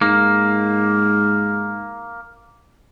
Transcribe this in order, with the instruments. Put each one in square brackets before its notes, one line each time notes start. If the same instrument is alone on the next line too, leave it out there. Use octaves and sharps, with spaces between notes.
[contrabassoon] G#2 [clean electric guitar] A#3